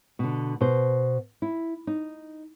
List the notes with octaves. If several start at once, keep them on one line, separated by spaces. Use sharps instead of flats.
B2 D3
B2 C5
E4
D#4